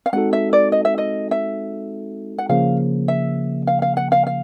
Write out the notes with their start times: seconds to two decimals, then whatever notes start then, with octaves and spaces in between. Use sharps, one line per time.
0.06 F5
0.13 G#3 C4 D#4 F#4 A4 F#5
0.33 E5
0.53 D5
0.72 D#5
0.85 E5
0.98 D#5
1.31 E5
2.38 F#5
2.49 C#3 F3 A#3 F5
3.08 E5
3.67 F5
3.82 F5
3.97 F#5
4.12 F5
4.27 F5